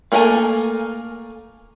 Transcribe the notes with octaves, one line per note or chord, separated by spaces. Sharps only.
A3 A#3 A4 A#4 G#5